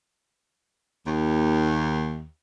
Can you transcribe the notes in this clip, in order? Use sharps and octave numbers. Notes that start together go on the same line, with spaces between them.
D#2